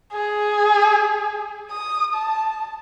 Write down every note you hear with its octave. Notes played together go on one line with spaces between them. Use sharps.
G#4
D#6
A5